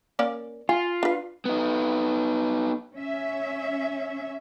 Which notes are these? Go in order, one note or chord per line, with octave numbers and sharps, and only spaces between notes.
A#3 C#4 D5
F4 G#5
D4 B4
B3 D#4
C#4 E5